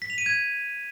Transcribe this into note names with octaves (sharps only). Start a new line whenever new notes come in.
B6
F7
D#7
G#6